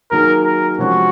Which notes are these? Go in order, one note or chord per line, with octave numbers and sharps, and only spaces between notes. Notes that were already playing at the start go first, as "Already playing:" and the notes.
D#3 F#3 A#3 D#4 G#4 A#4
A#4
C3 F3 G#3 C#4 F#4